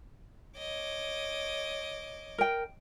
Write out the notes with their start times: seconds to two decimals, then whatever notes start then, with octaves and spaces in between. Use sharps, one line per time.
0.57 C#5 D#5 D6
2.38 A#4 G5